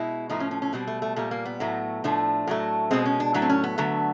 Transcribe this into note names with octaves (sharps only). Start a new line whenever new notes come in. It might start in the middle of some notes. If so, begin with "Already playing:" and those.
Already playing: B2 G#3 E4
A2 F3 A3 D#4
C#4
C#4
C#4
B2 G3 C4
A3
A3
A#2 G3 A3
A#3
B3
A2 F#3 A3
A2 F3 A3 D4
A2 F#3 A3
B2 G#3 C4
C#4
D4
A2 F#3 A3 D4
C4
C#4
B3
D3 F#3 A3